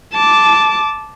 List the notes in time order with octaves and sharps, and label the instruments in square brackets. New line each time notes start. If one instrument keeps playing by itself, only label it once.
[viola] A5 D6